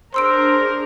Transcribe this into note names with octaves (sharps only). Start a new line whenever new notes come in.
D4 G#4 A#4 C5 A#5 C6 E6 D7